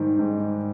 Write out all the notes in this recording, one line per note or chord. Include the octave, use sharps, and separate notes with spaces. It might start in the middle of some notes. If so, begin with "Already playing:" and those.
Already playing: G#2 D#3 G3
G#2